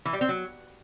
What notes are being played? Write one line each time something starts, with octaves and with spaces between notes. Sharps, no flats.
E3
G3
C4
F#3